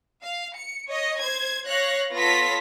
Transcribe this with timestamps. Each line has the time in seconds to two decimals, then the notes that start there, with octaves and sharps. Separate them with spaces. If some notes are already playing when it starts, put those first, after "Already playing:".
0.21 F5
0.57 C#7
0.89 C#5 D#5
1.19 C5 G#6
1.65 C#5 F5 F#6 A#6
2.13 B3 F4 A4 C#5 A#6 B6